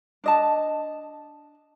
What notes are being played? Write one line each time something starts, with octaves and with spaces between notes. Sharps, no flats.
D4 D#5 A5